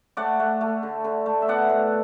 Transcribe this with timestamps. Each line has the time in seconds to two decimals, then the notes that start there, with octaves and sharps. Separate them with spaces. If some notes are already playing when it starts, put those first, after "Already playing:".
0.17 A3 D5 F#5
0.40 A3
0.61 A3
0.83 D3
1.04 D3
1.26 A3
1.42 E5
1.48 B3 D5 F#5
1.69 A2